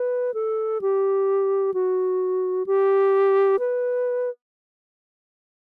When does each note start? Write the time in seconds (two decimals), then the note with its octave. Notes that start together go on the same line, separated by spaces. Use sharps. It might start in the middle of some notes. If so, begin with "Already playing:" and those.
Already playing: B4
0.34 A4
0.81 G4
1.74 F#4
2.66 G4
3.59 B4